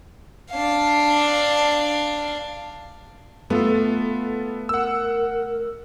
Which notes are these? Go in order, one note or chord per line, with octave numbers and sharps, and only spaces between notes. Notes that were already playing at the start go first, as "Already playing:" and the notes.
D4 F5
A3 B3 F4 A4
A#4 F#5 E6